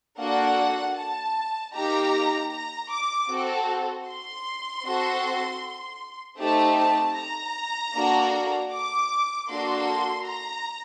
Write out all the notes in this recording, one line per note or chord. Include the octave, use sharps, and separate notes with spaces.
A#3 D4 F#4 A4 F#5
A5
A#3 D#4 G4 A#5
A#5
D6
C4 F#4 A4
C6
C4 F#4 A4
A3 C4 D#4 G4 A5
A5
A#5
A#3 D4 F#4 A4
D6
A#3 D4 F#4 A4 C6
A#5